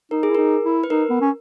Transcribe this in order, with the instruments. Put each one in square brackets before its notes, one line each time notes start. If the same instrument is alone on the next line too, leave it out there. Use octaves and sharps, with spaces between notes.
[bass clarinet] D#4 [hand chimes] A#4
[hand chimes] G#4
[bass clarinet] E4
[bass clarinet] D#4 [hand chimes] A#4
[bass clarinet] E4
[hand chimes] B4
[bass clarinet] D#4 [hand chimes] A#4
[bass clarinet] B3
C#4